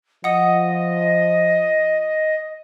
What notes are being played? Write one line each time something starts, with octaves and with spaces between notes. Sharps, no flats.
F3 D#5 F#5 D#6